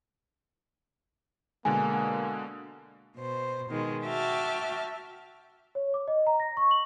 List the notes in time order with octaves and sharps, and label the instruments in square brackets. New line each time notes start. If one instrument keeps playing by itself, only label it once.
[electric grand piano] B2 D3 G#3 [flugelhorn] A#3 [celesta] G#5
[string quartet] B2 C5
B2 D#3 G#3
F#4 E5 G5 A5 D6 F6
[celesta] C#5
D6
D#5
A#5
A#6
C#6
F#7